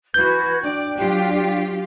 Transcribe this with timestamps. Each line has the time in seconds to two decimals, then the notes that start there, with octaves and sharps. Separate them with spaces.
0.14 E3 F#4 B4 G6 G#6
0.62 D4 D5 G5
0.96 F#3 F4 G4